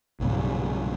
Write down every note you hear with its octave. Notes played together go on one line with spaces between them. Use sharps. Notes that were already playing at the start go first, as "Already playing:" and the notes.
B1 G2 A#2 C#3